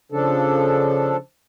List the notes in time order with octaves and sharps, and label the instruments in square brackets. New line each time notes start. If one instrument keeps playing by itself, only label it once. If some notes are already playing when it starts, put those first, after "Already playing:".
[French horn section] C#3 [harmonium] F3 D4 A4